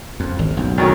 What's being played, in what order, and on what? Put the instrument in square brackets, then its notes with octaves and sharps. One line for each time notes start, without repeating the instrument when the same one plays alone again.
[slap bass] F2
G#1
B1 F#2
[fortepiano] D2 D#3 C#4